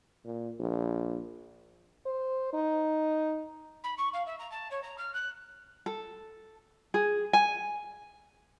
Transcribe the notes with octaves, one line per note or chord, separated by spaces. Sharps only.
A#2
A#1
C5
D#4
B5
C#6
F5
E5
A#5
A5
C#5
A#5
F6
F#6
A4
G#4
G#5